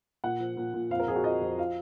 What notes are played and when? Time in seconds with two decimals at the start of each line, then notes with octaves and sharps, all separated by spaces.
0.24 A#2 F#5
0.40 F3
0.57 A#2
0.74 A#2
0.90 F2 F5
1.00 A#4
1.08 F2 G#4
1.16 F#4
1.24 F2 D#5
1.42 F2
1.58 F3 F5